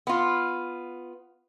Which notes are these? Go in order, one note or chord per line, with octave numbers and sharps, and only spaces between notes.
B3 F4